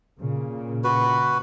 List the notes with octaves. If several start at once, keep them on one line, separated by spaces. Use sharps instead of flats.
A#2 C#3
F#4 B4